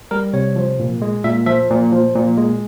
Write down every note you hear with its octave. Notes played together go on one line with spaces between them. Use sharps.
G3 A#4
C3 C#5
F3
A#2
G#3
A#2 E5
F3 E5
A#2
F3
A#2
G#3